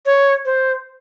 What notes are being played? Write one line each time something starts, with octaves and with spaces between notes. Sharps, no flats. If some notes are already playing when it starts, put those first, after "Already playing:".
C#5
C5